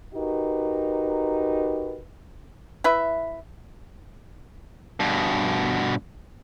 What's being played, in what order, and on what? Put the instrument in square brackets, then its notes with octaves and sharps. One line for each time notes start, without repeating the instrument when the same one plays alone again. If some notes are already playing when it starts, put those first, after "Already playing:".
[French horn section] D#4 F#4 G4 A#4 B4
[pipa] E4 B4 E5
[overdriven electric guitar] G2 B2